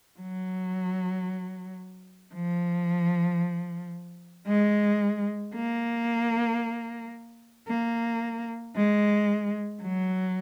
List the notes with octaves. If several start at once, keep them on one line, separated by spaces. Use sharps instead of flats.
F#3
F3
G#3
A#3
A#3
G#3
F#3